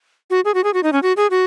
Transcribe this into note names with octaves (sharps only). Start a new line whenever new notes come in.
F#4
G#4
F#4
G#4
F#4
D#4
C#4
F#4
G#4
F#4